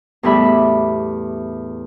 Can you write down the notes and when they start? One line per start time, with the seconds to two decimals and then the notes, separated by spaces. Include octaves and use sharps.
0.23 E2 A2 G3 G4 E5 B5